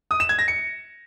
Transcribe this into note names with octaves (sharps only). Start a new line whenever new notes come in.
D#6
E7
G#6
A#6
C#7